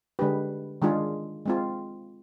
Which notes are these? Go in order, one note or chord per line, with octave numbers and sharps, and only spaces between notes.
D3 G#3 D4 G4 B4
D#3 G#3 D4 F4 G#4
G#3 C4 F4